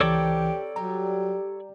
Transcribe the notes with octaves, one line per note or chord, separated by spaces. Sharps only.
C#2 E3 C4 G4 A4 A#4 C#5 D5
F#3 G3 G4 A#5